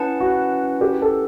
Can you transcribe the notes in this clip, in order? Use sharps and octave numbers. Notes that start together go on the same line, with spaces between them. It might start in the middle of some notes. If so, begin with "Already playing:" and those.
Already playing: C#4 E4 B4 F#5 A5
F#4
G4
A4